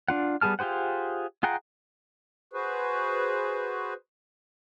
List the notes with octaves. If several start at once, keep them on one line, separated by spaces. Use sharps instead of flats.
D4 F4 F#5
G3 B3 G#4 A5 F6
F4 G4 G#4 C5 F#5
F4 G#4 F#5 G5 A#5
F#4 G#4 B4 C5